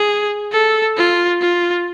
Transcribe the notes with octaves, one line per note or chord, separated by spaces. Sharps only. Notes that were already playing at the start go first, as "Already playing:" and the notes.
Already playing: G#4
A4
F4
F4